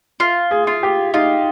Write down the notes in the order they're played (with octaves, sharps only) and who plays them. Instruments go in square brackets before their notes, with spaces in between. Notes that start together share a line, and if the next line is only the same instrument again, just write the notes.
[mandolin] F4
[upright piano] G#4
[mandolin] F4
[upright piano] G4
[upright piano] D#4 [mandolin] F4